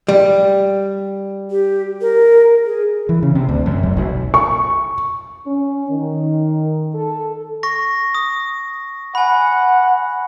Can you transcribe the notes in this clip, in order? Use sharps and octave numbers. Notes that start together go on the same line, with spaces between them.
G3
G4
A#4
G#4
E3
C#3
C3
D2
F#2
E1
B1
C#6
C#4
D#3
A4
C#6 A#6
D#6
F#5 G#5 B5